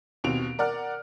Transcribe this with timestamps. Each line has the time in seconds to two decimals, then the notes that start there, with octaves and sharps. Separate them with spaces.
0.24 D#2 B2 C4 D7 F7
0.59 A#4 D5 F#5 F6